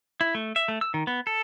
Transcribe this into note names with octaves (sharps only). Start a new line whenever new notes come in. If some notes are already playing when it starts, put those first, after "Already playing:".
E4
A3
E5
A3
E6
D#3
B3
A4